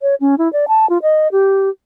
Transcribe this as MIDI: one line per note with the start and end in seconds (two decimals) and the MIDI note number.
0.01 0.15 73
0.21 0.35 61
0.38 0.51 64
0.53 0.65 74
0.68 0.88 81
0.89 0.98 65
1.02 1.28 75
1.32 1.69 67